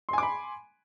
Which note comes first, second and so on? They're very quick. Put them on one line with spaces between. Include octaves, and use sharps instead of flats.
C6 G#5 D6 B5